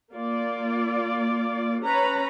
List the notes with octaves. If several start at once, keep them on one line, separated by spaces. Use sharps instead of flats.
A#3 F4 D5
C#4 B4 C#5 A#5 B5